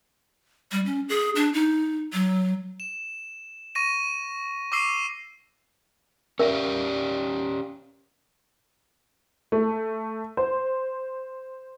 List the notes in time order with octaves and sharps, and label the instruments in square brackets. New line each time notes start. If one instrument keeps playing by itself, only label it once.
[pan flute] G3
C#4
G#4
D4
D#4
F#3
[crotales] E7
C#6 A#6 D#7
C#6 D6 E6 C7 D#7
[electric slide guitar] C#4 G4 D5 [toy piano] A#4 E5
[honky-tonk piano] A3
C5